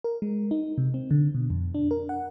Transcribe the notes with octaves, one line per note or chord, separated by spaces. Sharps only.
A#4
G#3
D#4
C3
C4
D3
B2
F2
D4
A#4
F#5